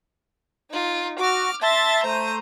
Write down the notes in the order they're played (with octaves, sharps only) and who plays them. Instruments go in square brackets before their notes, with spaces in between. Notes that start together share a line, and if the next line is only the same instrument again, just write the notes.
[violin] D#4 F4
[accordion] F#4 [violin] D6 F6
[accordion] E5 A5 C6 [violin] A6 A#6
[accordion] A3 C5 [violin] A#5 D#7